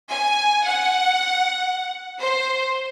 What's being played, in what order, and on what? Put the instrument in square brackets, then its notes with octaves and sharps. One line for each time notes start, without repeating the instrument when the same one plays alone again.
[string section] G#5
F#5
C5